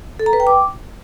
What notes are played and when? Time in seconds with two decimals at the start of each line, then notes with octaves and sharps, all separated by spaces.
0.20 A4
0.26 A#5
0.33 B4
0.40 G5
0.47 D6